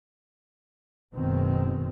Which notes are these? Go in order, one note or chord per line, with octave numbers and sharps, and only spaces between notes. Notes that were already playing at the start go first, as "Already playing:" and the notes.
F#1 F#2 B2 D#3 G#3 C4